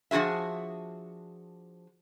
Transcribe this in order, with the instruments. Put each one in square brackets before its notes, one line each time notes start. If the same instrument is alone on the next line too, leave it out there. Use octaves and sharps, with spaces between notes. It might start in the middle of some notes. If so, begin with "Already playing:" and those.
[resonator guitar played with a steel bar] F3 D4 F#4 G#4 E5